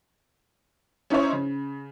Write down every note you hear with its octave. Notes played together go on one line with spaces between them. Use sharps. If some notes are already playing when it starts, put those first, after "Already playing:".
C#4 D#4 E4 C5 C#5
C#3